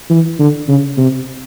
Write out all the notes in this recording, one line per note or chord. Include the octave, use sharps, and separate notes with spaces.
E3
D3
C#3
C3